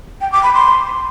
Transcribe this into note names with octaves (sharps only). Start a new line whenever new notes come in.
G5
D6
B5
C6